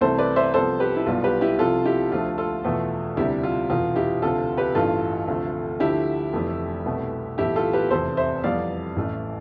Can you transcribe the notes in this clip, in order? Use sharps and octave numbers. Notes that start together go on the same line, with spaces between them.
C2 C3 E3 A3 A4 C5
B4 D5
C5 E5
C2 C3 F3 B3 A4 C5
G4 B4
E4
B1 B2 G3 B3 F4
G4 B4
E4 G4
C2 C3 F3 F4 A4
E4 G4
D2 D3 F3 A3 F4
F4 A4
E2 B2 A3
D2 C3 G3 E4 G4
F4
F1 E2 B2 F4
E4 G4
D2 C3 F3 F4 A4
G4 B4
A1 G2 E3 A3 F4 A4
D2 C3 F3 A3
D2 D3 F3 A3 E4 G4
F1 F2 E3 A3
C2 B2 A3
B1 A2 E3 A3 E4 G4
F4 A4
G4 B4
F1 E2 C3 A4 C5
C5 E5
F2 E3 G3 B3 D5 F5
A1 A2 E3 A3